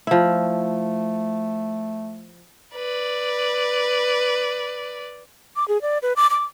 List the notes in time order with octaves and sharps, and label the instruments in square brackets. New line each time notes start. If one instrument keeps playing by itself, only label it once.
[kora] F3 E4 [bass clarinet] A3
[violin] B4 D5
[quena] D6
G#4
D5
B4
D6
D6